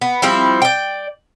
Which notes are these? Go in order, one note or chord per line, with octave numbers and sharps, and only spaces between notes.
B3
F3 G3 C4 E4
D5 G5